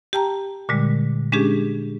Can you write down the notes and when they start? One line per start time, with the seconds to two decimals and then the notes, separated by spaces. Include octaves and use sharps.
0.13 G4 G5 A5 A#5
0.69 A#2 D3 G3 G#3
1.32 G#3 C#4 D4 G4 G#4